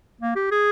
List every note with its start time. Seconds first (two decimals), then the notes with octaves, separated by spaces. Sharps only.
0.21 A#3
0.36 G4
0.52 G#4